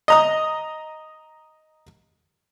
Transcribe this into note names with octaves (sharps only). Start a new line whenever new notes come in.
D#5 A#5 D#6